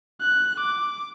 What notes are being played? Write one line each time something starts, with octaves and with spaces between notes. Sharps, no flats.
F#6
D6